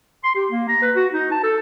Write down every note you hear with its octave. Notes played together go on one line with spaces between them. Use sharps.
C6
G4
A#3
A#5
B4
F#4
D#4
A5
A4